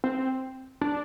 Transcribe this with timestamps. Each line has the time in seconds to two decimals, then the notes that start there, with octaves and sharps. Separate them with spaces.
0.04 C4
0.81 D4